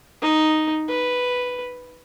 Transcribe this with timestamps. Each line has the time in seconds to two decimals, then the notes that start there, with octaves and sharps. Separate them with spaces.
0.22 D#4
0.89 B4